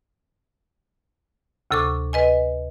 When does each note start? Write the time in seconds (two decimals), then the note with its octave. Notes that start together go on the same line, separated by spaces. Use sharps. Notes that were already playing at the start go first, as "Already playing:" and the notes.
1.71 D2 C3 A4 C#6 D6
2.13 B4 D#5 G#5